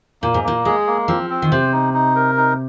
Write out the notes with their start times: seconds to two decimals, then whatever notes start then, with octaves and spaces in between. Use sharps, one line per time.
0.23 A#2 A#3
0.34 G#2
0.44 A#2 A#3
0.65 G#3 G#4
0.87 A#3
1.08 F3 C4
1.30 C4
1.42 D#3
1.51 C3 C5
1.73 D#4
1.94 D#4
2.16 A#4
2.37 D#4